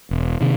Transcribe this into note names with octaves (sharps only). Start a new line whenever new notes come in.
E1
C3 D#3